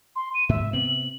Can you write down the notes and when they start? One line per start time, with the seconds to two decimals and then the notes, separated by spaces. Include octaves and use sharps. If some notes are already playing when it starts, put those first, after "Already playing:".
0.16 C6
0.34 D#7
0.49 G#2 E5
0.73 C3 B3 C4 F#7